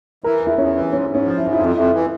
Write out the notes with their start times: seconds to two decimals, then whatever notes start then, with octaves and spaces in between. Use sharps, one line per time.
0.24 E3 A#4
0.41 E2
0.46 E4
0.58 E2 C#4
0.75 E3
0.92 G#2 C#4
1.10 G#2
1.15 C#4
1.25 F3
1.37 E4
1.43 G#2
1.53 E4
1.59 F2 F4
1.76 F2 E4
1.93 E3